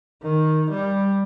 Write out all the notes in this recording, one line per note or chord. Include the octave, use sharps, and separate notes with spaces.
D#3
G3